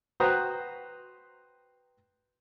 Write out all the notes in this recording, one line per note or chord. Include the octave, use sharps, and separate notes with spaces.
F#4 B4 C5 G5 A#5 D#6